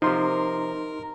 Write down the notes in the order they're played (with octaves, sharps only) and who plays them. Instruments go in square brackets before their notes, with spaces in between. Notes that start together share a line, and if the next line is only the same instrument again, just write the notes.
[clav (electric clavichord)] C3 F3 [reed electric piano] D#4 C6 [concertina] A#4